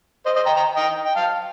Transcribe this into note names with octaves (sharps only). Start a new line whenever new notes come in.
C5 D#5
C5 D#5
G5 A#5
G5 A#5
D#5 G5
G5
F5 A5